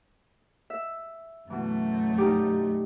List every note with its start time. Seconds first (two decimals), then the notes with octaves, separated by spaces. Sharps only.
0.70 E5
1.50 F#2 B2 E3 A3
2.18 G3 D#4 G4